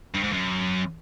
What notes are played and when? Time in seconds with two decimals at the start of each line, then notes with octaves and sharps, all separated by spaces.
0.15 G2
0.24 G#2
0.33 F#2